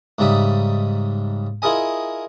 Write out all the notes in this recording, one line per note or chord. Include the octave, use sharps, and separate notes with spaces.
G#2 C#3 G3 D#4 E5 D#6
E4 F4 G#4 A#4 D#5 G#5